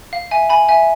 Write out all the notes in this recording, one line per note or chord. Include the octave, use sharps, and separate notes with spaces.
F5
E5 G#5
G#5 B5
E5 G#5